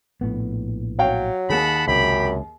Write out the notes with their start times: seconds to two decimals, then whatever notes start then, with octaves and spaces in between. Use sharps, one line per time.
0.21 A#1 A2 B3
0.99 F#3 C#5 F5 G5
1.50 D#2 D#3 G#4 F#5 A5 B5
1.88 C#2 F#2 C3 G4 B5